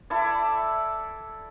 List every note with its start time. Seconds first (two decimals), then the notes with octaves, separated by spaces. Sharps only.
0.10 E4 A4 D5